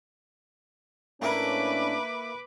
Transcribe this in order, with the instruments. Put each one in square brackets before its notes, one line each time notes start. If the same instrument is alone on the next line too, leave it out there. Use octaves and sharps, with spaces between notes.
[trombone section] A2 C#4 D4 [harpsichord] A#3 E4 [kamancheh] B4 D6